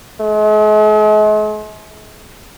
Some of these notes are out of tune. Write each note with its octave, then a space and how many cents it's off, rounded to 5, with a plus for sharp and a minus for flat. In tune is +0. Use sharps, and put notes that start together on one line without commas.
G#3 +45